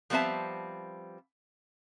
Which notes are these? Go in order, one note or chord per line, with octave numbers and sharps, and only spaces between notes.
F3 G3 B3 C4 E5 A5